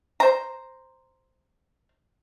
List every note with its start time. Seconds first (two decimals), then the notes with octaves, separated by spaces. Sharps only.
0.20 C5 A#5